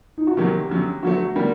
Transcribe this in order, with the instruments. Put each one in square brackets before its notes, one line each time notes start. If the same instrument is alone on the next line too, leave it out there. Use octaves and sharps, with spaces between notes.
[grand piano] D#4
F#4
[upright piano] D2 C3 D#3 F#3 A#3 [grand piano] G4
[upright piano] F#2 D3 F#3
[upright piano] D3 F#3 A3 [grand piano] F#4
[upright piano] D3 G3 A#3